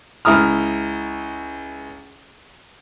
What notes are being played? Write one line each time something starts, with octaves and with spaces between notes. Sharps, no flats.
C#2 E4 A#5 D#6 F6